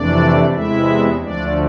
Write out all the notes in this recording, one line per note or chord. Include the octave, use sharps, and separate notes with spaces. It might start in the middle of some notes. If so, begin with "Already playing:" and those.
Already playing: F2 C3 E3 A3 D4 D5
E2 C3 E3 G#3 E4 E5
D2 D3 F3 A3 D4 D5